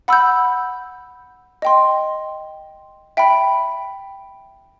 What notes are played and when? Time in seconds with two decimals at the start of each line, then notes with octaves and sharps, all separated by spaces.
0.08 F#5 B5 E6 G6
1.62 D#5 G5 C6
3.17 E5 G5 B5